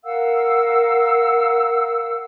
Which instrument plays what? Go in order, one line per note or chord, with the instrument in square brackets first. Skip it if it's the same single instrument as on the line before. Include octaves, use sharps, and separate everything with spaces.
[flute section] A#4 F5 F#5 E6